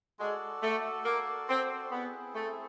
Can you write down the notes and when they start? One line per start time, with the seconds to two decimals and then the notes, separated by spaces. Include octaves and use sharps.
0.20 G#3 F#4 A4 D5
0.63 A3
1.05 A#3
1.49 C4
1.91 B3 C4 E4 G#4 C5
2.35 A3